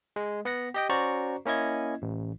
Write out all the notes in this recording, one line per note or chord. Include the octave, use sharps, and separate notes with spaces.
G#3
B3 F#5 A#6
G4 D#5 G5
C#4 F#4 C5 D5 A#5 C#6
A#3 C#4 E4 D#5 G#6
A1